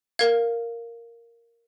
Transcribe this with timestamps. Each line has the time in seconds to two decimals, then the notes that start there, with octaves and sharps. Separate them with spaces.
0.19 A#4 F5 G#6